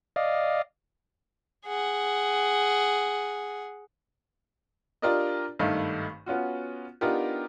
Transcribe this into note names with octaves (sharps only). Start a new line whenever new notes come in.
D5 D#5 F5
G#4 F#5
D4 F4 G4 A#4 D5 D#5
G#1 G2 D#3 A3 F5
B3 C#4 F4 F#4
B3 D4 D#4 F4 G4 A#4